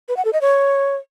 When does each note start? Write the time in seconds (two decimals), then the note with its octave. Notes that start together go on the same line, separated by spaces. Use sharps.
0.09 B4
0.17 F#5
0.25 A4
0.33 D#5
0.41 C#5